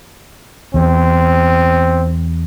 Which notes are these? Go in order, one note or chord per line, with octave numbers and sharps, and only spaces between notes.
E2 C4